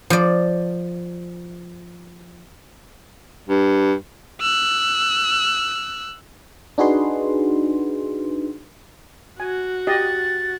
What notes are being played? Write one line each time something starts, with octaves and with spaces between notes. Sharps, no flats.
F3 D5
G2
E6 F#6
D4 D#4 F#4 G#4 B4 C6
F#4 G#5
G4 D#5 A6